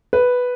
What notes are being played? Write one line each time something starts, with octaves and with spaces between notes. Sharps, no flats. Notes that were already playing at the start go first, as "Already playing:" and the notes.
B4